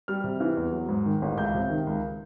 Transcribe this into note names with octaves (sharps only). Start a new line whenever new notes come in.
G3 F6
C3
E3
E2
F#3
G#2
D#3
A1
C#2 G6
C3
D#3
C#2